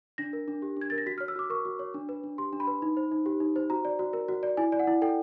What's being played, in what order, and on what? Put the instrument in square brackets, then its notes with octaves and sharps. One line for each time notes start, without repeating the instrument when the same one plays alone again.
[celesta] D4 A#6
A#4
D4
G4
D4 G#6
A#4 A6
A#6
F#4 B6
F6
C#5
E6
F#4 D6
A#4 C#6
F#4
C#5
D4
B4
D4
G4 C6
D4
B5
B4
D#4
C5
D#4
G4
D#4
C5
F#4 A#5
D5
F#4
A#4
F#4
D5
E4 G#5
D5
F#5
E4
A4 G5